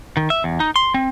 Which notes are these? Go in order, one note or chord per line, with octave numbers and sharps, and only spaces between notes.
D#3
E5
E2
D#4
C6
C4